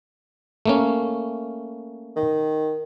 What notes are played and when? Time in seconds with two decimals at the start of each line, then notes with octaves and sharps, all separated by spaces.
0.66 A3 A#3 C#4
2.16 D#3